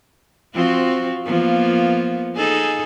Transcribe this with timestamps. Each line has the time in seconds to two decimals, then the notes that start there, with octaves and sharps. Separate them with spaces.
0.54 F3 C4 F#4
1.26 F3 A#3 B3
2.36 D#4 G#4 A4